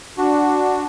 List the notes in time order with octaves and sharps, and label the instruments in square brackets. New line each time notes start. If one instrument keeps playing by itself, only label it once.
[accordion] D4 F#4